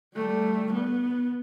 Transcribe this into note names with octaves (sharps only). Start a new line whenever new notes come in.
G3 A3
B3